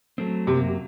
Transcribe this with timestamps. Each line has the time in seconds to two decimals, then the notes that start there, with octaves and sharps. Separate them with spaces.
0.18 F#3 A3 C4
0.47 F#2 C3 F#3 A#3